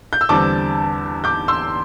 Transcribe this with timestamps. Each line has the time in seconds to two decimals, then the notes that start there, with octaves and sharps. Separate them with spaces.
0.13 G6
0.21 E6
0.29 E2 D3 G3 C4 A5 D6
1.24 D6 G6
1.48 C6 E6